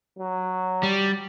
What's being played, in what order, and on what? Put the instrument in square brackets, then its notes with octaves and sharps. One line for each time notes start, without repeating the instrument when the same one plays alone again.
[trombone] F#3
[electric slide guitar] G3